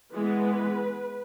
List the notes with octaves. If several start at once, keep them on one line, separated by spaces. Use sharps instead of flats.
E3 G#3 B3 B4